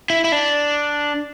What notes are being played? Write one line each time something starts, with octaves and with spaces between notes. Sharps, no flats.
E4
E4
D4